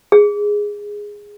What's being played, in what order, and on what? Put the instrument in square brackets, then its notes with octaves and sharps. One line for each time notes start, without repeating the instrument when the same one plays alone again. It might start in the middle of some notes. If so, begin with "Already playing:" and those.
[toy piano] G#4